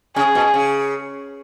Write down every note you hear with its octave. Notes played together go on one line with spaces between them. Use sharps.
C#3 G#4
B2
C#3